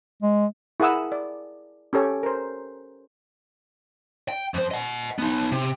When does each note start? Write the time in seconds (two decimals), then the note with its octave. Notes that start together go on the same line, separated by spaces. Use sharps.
0.22 G#3
0.80 E4 G#4 A#4 F#5 D#6 E6
1.12 D5
1.93 C#4 G4 A4 C#5
2.23 A#4 C5
4.29 G5
4.54 F2 C5
4.71 D#5 F#5
5.19 B3 D#4
5.52 C3